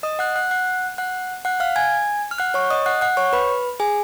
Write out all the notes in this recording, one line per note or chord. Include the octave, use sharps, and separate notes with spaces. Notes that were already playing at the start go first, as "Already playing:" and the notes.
D#5 D#6
F#5 F#6
F#5 F#6
F#5 F#6
F#5 F#6
F#5 F#6
F5 F6
G#5 G#6
F6
F#5 F#6
C#5 C#6
D#5 D#6
F#5 F#6
F#5 F#6
C#5 C#6
B4 B5
G#4 G#5